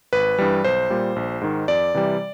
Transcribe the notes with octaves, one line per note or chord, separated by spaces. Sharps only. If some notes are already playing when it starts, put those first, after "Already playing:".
G#1 B4
G2 E3 G3
B1 C5
A#2 G3
A#1
G#2 D#3
F2 D5
C3 E3 G3